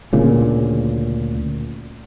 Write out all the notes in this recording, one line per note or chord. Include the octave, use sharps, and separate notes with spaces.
D2 A#2 C#3